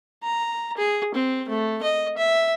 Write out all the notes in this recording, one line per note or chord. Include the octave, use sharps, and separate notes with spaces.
A#5
G#4
C4
A3
D#5
E5